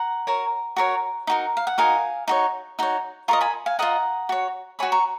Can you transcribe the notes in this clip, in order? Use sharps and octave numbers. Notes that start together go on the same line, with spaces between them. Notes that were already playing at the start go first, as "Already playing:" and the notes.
Already playing: F#5 A#5
F#4 A#4 C#5
F#4 A#4 C#5
D#4 F#4 A#4
F5
F#5
D#4 F#4 A#4 F5 G#5
D#4 F#4 C#5
D#4 F#4 C#5
F4 A#4 D#5 A#5 C#6
G#5 B5
F5 G#5
F4 A#4 D#5 F#5 A#5
F#4 C#5
F#4 C#5 G#5 B5
A#5 C#6